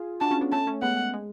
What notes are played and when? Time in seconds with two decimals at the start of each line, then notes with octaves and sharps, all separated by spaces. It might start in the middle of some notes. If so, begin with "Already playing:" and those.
Already playing: F4 G#4
0.21 D4 F#4 A5
0.31 C#4 F4
0.41 B3 D4
0.52 A3 C#4 A5
0.67 A3 C#4
0.82 G#3 B3 F#5
1.13 G#3